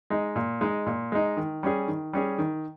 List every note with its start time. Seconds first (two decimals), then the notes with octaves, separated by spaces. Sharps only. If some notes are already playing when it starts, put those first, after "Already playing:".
0.10 G#3 D#4
0.36 A#2
0.61 G#3 D#4
0.86 A#2
1.12 G#3 D#4
1.37 D#3
1.63 G3 C#4 G#4
1.88 D#3
2.13 G3 C#4 G#4
2.38 D#3